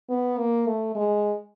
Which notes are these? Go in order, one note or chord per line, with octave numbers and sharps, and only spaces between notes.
B3
A#3
A3
G#3